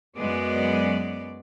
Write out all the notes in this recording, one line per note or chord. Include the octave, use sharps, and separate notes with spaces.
F#2 F#3 G#3 B3 D5